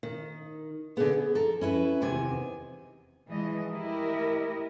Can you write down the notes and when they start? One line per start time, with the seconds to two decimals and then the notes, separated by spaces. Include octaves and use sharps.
0.03 D#3
0.97 D3 B3 G#4
1.35 A4 A#4
1.61 C#4 E4 B4
2.02 E2 C3 D#3 G#5
3.29 E3 F3 G#3 D#5
3.70 A3 E4 G4 A#4 D#5